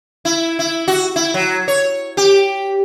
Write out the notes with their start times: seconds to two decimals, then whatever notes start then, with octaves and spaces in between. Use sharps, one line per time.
0.25 E4
0.59 E4
0.88 F#4
1.16 E4
1.34 F#3
1.68 C#5
2.17 G4